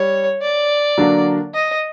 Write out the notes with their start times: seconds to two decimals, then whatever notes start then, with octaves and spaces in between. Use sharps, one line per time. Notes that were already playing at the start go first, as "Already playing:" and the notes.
Already playing: G3 C#5
0.42 D5
0.98 D3 F#3 A#3 D4
1.54 D#5